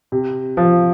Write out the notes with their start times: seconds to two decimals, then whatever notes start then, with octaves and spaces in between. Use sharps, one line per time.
0.12 C3
0.57 F3